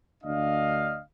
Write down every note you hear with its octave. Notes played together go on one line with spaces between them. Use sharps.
D2 D4 D#5 F5